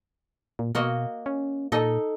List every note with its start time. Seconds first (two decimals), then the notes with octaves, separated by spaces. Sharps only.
0.59 A#2
0.75 B2 A#3 F#4 D#5
1.26 C#4
1.72 A#2 D#4 A4 D#5